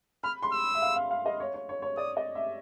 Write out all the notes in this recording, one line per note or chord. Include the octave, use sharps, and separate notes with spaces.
B5 F6
C6
E6
E5
F5
F5
F5
D#5
C#5
C#5
C#5
C#5
D5 D#6
D#5
E5